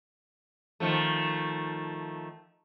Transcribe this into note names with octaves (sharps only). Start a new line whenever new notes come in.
D#3 F3 A3